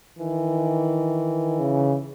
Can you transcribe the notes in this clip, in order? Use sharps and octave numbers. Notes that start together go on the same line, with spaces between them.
D#3 E3
C#3